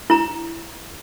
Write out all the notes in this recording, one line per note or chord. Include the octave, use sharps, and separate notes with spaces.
E4 A#5